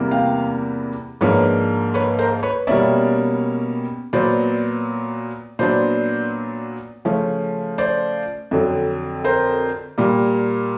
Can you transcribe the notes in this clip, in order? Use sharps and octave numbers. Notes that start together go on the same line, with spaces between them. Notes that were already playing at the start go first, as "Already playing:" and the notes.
Already playing: E2 C3 E3 G3 A#3
F5 G5
G#2 F3 A#3 D4 B4 C#5
B4 C#5
A#4 C5
B4 C#5
B2 G3 A#3 C#4 D5 E5
A#2 F#3 B3 C5 D5
A#2 F#3 B3 D4 C5 D5
C#3 F3 A3 C#4
C5 D5
F2 D3 F#3
A#4 C5
A#2 G3 A#3